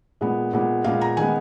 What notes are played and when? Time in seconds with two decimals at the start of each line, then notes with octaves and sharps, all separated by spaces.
0.21 A#2 G#3 B3
0.53 A#2 G#3 B3
0.84 A#2 G#3 B3 F5
1.01 A#5
1.17 D#3 G#3 B3 G#5